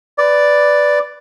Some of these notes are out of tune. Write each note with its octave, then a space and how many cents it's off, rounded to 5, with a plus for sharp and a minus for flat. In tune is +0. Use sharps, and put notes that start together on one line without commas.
B4 +5 D5 +0